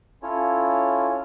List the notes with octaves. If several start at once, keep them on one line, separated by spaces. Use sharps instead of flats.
C#4 E4 F4 A4 C#5